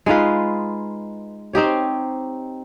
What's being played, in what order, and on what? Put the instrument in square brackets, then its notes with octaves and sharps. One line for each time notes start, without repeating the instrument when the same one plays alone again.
[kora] G#3 D#4 F4 B4
C4 D#4 G4 C#5